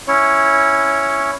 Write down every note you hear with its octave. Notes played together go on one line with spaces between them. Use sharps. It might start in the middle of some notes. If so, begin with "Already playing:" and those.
C#4 E4 C#5